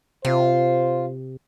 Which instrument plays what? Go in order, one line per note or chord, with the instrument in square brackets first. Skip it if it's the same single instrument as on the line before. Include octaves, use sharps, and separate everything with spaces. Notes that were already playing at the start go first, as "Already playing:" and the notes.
[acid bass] C3 [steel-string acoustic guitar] F4 [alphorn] C5